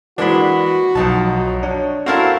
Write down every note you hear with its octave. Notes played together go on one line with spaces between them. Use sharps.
E3 G#3 A#3 D4 F#4 B5
B1 F2 D#4 A5
F#3
D4 C#5
A3 C4 E4 F#4 A#4 F5 A5